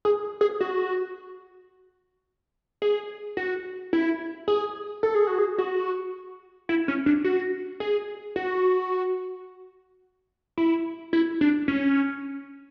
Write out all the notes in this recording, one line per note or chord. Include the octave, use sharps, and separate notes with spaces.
G#4
G#4
F#4
G#4
F#4
E4
G#4
A4
G#4
F#4
G#4
F#4
E4
C#4
D4
F#4
G#4
F#4
E4
E4
D4
C#4